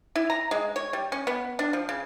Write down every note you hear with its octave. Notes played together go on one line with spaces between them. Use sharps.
E4
A#5
G#3
C#5
G3
C#4
B3
D4
F3
C#3